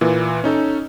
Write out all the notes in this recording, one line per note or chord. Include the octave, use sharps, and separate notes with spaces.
A#2 E3
C#4 D#4 A4